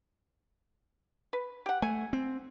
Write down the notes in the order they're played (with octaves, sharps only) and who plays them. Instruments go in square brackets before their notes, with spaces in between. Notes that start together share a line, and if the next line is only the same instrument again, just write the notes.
[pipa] B4
G4 F#5
[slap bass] A3 [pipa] G#5
[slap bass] C4